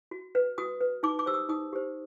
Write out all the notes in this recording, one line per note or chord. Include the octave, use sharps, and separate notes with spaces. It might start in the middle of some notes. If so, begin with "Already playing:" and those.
F#4
B4
F#4 D#6
B4
D#4 D6
D6
G4 C5 E6
D#6
D#4 D#6
G4 C5